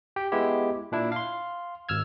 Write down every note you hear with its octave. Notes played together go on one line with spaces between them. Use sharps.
G4 G5
G#3 B3 E4 G4
A#2 D4 E4
F5 C6
G#1 E6 F6 G#6